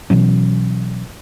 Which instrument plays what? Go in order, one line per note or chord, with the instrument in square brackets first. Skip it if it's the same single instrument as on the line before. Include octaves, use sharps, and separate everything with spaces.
[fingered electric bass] B2 E3 F#3 C#4